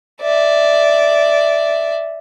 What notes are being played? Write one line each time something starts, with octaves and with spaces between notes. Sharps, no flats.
D5 E5